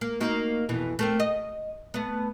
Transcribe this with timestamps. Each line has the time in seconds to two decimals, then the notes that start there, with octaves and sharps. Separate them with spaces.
0.01 A#3
0.20 A#3 D#4 F#4
0.69 F2 B2 E3
0.99 A3 A#3 C4
1.20 D#5
1.94 A3 B3